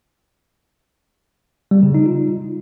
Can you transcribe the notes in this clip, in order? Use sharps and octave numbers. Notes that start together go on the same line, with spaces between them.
G3
C#3
D#4
F4